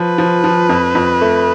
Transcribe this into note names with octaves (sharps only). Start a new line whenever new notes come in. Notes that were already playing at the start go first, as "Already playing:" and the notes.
Already playing: F3 B4
F3
F3
F2
F2
A3